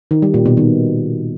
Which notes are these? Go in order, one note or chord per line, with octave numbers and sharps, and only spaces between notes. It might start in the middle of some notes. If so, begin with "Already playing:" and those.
D#3
G3
A#2
B2
D#3